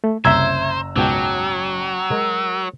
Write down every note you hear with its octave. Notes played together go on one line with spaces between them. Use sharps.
A3
F#1 C2 C5 E5 A#5 E6 G#6
C#2 G#2 B2 F#3 G5 A5 D6
G#3 A#4